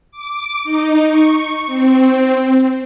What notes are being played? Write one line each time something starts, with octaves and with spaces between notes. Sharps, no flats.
D6
D#4
C#6
C4